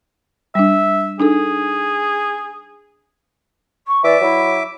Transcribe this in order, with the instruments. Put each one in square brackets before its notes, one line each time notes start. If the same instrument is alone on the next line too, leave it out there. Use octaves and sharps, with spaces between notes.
[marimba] G3 D4 [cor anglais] E5
[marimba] D4 D#4 A4 [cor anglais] G#4
[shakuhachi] C#6
[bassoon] E3 [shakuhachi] D5 [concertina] E5 D6
[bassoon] F#3 [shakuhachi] E4